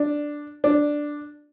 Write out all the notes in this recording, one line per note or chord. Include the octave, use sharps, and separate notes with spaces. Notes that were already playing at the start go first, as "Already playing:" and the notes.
Already playing: D4
D4